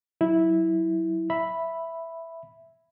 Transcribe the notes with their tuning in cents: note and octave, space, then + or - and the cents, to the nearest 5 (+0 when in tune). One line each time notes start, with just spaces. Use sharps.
F#3 +0 E4 -10
E5 +0 B5 +0